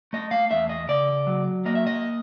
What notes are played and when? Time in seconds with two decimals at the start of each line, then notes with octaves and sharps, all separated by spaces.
0.13 A3 D#5
0.31 F5
0.51 E2 E5
0.69 D#5
0.88 C#3 D5
1.27 F#3
1.65 A#3 D#5
1.75 E5
1.87 D#5